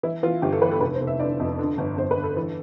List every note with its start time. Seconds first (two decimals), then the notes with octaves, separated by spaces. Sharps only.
0.03 E3 E4
0.23 E3 F4
0.42 G1 G4
0.53 A4
0.61 E3 B4
0.71 A4
0.81 F1 B4
0.94 C5
1.01 F1
1.07 E5
1.20 D3 D5
1.40 F2
1.59 D3
1.78 G1
1.98 G1 C5
2.11 B4
2.17 G1
2.24 A4
2.37 E3